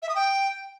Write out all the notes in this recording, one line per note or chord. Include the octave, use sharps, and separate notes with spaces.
E5
D#6
G5